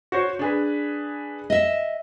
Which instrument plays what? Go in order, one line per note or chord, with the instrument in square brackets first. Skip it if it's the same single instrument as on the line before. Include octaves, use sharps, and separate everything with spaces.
[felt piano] F#4 C5 C#5
D4 G#4 B4
[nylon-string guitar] D#5 E5